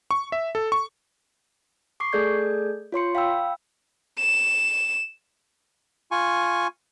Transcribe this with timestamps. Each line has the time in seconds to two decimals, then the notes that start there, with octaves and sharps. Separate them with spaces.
0.11 C#6
0.32 E5
0.55 A4
0.72 C#6
2.00 C#6 D6 C7
2.13 A3 G#4 A4 D5 G6 G#6
2.92 F4 C#5 C6 C#7
3.15 F5 G5 B5 E6
4.19 E7
6.11 F4 G#5 C#6